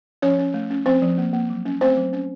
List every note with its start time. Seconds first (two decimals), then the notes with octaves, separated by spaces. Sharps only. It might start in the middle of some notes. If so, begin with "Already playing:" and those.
0.22 F3 C#4 C#5
0.39 C#4
0.54 A3
0.70 C#4
0.86 F3 C4 C5
1.02 F3
1.18 A#3
1.33 A#3
1.50 F#3
1.65 C#4
1.81 A3 C4 C5
1.97 F#3
2.13 C#4